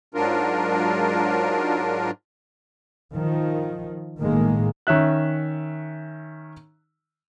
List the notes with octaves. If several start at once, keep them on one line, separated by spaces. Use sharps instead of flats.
G#2 F#3 D4 F4 A#4
D#3 F3
A1 A2 D#3 G#3 A#3
D#3 C#4 E5 F#6